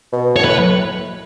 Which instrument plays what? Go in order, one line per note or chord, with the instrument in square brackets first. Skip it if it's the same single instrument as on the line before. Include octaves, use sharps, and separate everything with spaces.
[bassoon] B2
[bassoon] A2 [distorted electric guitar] C#5
[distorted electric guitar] B4
[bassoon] A2